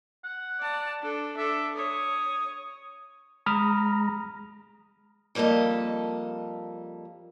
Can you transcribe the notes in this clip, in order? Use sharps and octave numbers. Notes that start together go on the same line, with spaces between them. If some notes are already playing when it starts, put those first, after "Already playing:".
F#5
D5 A5
D4 A4
D4 A4 E5
C#5 D#6
G#3 A#5 B5 D#6 F6
F2 G3 A#3 A4 D#5